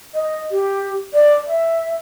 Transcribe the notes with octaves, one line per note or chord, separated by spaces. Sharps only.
D#5
G4
D5
E5